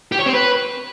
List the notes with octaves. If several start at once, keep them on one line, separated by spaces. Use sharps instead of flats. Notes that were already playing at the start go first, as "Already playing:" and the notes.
G4
C#5
C4
B4